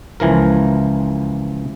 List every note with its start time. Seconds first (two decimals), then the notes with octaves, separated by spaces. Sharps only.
0.20 C#2 E3 F3 A#4